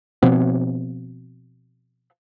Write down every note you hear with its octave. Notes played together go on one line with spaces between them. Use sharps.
B2 F3 B3 C4